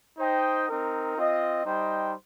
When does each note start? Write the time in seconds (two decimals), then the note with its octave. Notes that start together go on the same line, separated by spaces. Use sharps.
0.18 D#4 C5 D#5 G5
0.67 C4 D#4 A#4
1.16 C4 F4 D#5
1.65 G3 D#4 C5 D#5 G5